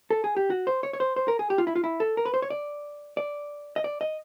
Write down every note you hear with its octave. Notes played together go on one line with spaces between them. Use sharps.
A4
G#4
G4
F#4
C5
C#5
C#5
C5
C5
A#4
G#4
G4
F4
E4
F4
E4
A4
A#4
B4
C5
C#5
D5
D5
D#5
D5
D#5